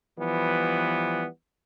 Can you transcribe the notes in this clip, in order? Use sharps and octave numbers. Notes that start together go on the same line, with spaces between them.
E3 F3 G3 B3